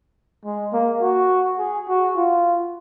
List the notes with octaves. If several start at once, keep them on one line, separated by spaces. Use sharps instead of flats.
G#3
A#3
F#4
G#4
F#4
F4